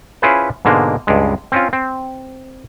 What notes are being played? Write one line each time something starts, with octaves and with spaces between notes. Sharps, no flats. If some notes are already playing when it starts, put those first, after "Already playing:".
C#4 E4 F4 G#4 B4 C5
G#2 B2 D3 G#3 A#3
C#2 G2 G#3
C4 C#4 F4
C4